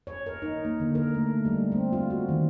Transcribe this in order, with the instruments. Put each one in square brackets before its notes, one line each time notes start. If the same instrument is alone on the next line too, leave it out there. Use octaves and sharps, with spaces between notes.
[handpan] C#5
A#4
D#4
A#3
D3
A#4
A3
G3
C4
F4
F#4
D#3